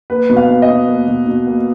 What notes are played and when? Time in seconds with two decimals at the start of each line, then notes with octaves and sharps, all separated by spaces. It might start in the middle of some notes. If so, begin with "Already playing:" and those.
0.10 A#3 B4
0.30 B2
0.36 F5
0.49 B2
0.62 D#5
0.68 B2
0.88 A#3
1.08 B2
1.27 B2
1.47 A#3